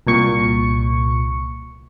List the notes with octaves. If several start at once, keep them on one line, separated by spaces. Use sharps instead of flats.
C2 A#2 C#6 C#7